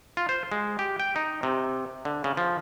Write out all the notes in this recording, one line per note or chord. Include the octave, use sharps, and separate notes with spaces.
F4
C5
G#3
G4
G5
D#4
C3
D3
C#3
F3